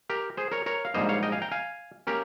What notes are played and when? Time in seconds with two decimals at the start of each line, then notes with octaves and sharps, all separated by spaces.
0.10 G4 A#4
0.37 G#4 C5
0.51 A#4 C#5
0.66 A#4 C#5
0.85 F5
0.94 A#1 G#2 G3 A#3 C5 D#5
1.09 C#5 F5
1.23 D#5 G5
1.32 F5 G#5
1.42 G5 A#5
1.51 F5 G#5
2.07 A#3 C#4 G4 A#4